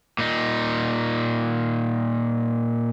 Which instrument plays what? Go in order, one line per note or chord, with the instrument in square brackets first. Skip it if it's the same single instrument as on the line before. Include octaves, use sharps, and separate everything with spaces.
[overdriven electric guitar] A#2 D#4